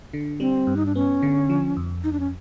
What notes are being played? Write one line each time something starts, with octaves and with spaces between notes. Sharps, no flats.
D3
G3 C4
G2
D#4
D4
B3 C#4
D3
F3
F2
F2 D#4
D4
C#4